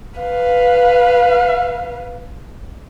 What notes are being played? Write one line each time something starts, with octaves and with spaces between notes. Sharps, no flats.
B4 F5